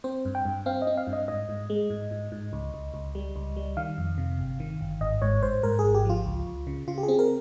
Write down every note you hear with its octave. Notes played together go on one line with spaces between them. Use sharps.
C4 C5
G2
G5
G2
C4 F5
D#5
C4
F5
G2
D#5
G#2 D#5
G#2
G#3
G#2
G#2
G#2
C#2
C#2
C#2
G3
C#2
G3
D#3 F5
F2
C3
G1
D#3
G1
G#1 D#5
G#2 C#5
G#2 C5
G#2 A#4
G#4
G#1
G4
F3 F4
C#2
C#2
C#3
C#3 F4
G4
G#4
C4
A#4